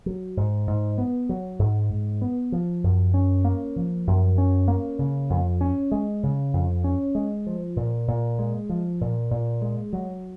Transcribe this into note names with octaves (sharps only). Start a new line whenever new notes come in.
F#3
G#2
G#2
B3
F#3
G#2
G#2
B3
F3
F#2
C#4
A#3
F3
F#2
C#4
A#3
C#3
F2
C#4
G#3
C#3
F2
C#4
G#3
F3
A#2
A#2
G#3
F3
A#2
A#2
G#3
F#3